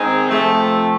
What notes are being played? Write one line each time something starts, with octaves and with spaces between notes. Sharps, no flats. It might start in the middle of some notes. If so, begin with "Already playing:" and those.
Already playing: D#3 G#3 C4 D#4 G#4
C3 F3 A3